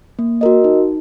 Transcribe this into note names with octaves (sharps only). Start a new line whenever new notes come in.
A#3
F#4 A#4 D#5
D#4